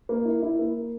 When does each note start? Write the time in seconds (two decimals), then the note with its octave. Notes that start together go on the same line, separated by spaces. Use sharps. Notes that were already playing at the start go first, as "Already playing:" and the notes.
0.09 A#3
0.25 E4
0.42 E4
0.59 A#3